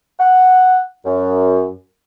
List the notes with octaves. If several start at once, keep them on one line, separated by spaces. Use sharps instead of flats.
F#5
F#2